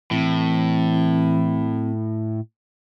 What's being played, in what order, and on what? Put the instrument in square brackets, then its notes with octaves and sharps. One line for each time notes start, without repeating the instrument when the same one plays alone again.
[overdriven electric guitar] A2 [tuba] E3 [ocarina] C4